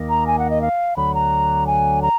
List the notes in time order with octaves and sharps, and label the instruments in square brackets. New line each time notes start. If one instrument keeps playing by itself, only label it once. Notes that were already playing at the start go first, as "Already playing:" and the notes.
Already playing: [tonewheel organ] D#2 D#3 A#3
[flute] A#5
G#5
F#5
D#5
F5
[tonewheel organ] D2 D3 F#3 [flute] B5
[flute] A#5
G#5
A#5